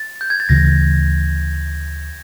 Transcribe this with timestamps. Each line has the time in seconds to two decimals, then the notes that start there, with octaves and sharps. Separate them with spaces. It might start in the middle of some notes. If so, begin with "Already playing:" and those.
Already playing: A6
0.21 G6
0.30 G#6
0.40 A6
0.49 D2 C#3 E3 A#6